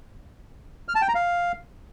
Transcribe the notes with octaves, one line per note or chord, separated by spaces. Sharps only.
F6
A5
G5
A#5
F5